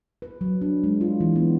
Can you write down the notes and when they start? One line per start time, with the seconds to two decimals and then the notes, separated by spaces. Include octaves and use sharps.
0.22 B4
0.41 F#3
0.61 D4
0.84 G#3
1.01 F4
1.20 E3
1.36 B3